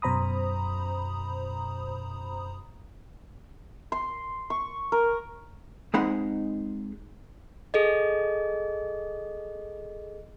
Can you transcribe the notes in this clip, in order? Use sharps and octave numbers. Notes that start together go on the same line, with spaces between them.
F#2 B2 C5 A#5 B5 D#6
C6
C#6
A#4
G#3 C4 D#4 G#4 F#5 B5
G#4 A4 D#5